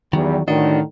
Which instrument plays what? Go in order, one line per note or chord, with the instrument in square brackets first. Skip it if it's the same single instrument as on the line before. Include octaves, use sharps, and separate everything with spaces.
[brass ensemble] E2 G3 [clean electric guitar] D#3 F#3
[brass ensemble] A2 D3 D#3 [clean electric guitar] D4 F#4 D#5